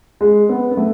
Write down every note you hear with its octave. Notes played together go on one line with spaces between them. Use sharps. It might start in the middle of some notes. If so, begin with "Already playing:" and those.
G#3
B3
B3
A3